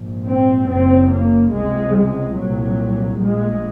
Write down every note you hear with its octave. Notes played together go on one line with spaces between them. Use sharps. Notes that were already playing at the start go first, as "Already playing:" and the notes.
Already playing: A#1 G#2
C4
F#1 F#2 C#3 C4
A#3
C#2 C3 G#3
G#3
C2 A#2 F#3
A#1 A#2 G#3